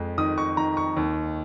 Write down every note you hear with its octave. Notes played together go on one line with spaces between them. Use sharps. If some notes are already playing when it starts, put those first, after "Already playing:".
Already playing: F2 G#3
D#3 D#6
C#6
D#3 A#5
C#6
D#2